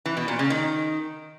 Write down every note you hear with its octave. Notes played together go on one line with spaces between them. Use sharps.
E3
B2
A#2
C#3
D#3